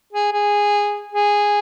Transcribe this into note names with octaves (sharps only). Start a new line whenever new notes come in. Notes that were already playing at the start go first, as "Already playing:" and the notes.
G#4
G#4
G#4